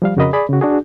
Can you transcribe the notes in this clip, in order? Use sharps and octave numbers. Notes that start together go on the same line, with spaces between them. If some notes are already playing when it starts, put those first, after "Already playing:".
F3 G3 F5
F2 C#3 F#4 A#4 D#5 B5
G#4 D5 B5
C#3 F#4
D4 F#4 G#4